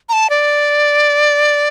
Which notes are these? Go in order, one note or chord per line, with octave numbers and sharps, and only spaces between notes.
A#5
A5
D5